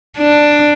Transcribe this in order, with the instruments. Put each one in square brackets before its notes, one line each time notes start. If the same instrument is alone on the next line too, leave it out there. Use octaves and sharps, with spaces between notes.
[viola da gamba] D4